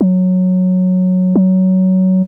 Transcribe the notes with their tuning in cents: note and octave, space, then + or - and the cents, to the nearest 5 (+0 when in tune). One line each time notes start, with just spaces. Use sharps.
F#3 -10
F#3 +15